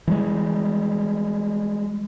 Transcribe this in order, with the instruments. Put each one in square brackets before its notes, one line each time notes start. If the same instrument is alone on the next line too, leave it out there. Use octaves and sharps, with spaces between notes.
[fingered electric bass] E3 G3 G#3